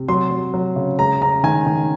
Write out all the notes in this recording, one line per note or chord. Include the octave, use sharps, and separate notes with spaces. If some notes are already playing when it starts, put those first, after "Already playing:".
Already playing: C3
F#3 C6
F#3
F#3
C#3
G#3 A#5
C#4 A#5
D#3 G#5
D#3